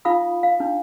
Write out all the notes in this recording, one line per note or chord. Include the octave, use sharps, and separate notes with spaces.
D#4 F4 F5 B5 D#6
F5
D4 D#4